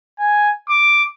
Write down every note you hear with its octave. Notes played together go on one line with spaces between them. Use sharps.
G#5
D6